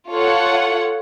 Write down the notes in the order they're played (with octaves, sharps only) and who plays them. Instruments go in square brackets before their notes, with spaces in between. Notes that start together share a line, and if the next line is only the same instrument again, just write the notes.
[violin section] F4 A4 C#5 F#5